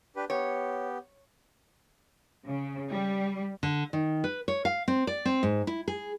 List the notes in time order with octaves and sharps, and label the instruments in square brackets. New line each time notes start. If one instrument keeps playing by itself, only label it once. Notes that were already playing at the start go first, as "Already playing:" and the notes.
[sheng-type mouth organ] D4 G4 B4
[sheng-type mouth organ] B3 G4 [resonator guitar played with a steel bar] C#5
[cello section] C#3
G3
[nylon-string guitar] D3
D#3
B4
C#5
F5
C4
D5
C4
G#2
E4
G#4